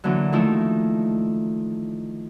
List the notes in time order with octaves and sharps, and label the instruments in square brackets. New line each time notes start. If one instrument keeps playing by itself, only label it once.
[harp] D3 E3 F#3 A#3
D#3 F3 A3 D#4 E4